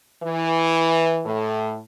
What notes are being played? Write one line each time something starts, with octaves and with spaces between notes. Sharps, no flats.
E3
A2